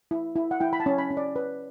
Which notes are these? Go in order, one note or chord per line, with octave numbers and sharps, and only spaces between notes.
E4
E4
F#5
E4 G5
B5
A5
C#4
B5
C#4
D5
B4